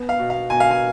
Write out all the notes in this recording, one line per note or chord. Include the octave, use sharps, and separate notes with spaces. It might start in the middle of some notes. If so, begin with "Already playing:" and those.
Already playing: B3
F5
B2
F5
B2 G#5
F5
G#5